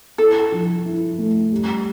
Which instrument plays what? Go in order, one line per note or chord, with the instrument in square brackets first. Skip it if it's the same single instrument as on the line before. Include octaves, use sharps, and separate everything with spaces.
[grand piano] E4 [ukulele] A4
[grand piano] F3
E4
A3
G3